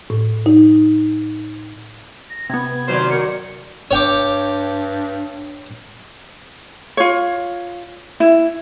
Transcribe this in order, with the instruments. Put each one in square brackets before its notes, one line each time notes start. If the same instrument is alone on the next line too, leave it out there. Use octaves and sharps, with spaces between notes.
[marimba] A2
D#4
[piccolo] A#6
[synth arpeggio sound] C3 B3 [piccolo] G#6
[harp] F#2 D#3 D5 [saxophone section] F4 B4 C5
[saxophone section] D#4 F#4 A#4 [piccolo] C#7
[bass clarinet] G2 [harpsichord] C#5 G5 D6
[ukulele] F4 C#5
E4